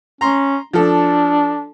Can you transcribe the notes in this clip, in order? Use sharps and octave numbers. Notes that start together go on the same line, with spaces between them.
C#4 A#5 C6
F3 D4 A4